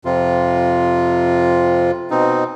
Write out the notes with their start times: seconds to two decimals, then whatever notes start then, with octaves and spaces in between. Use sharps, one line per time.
0.05 F2 C3 F4
2.11 B2 C4 D#4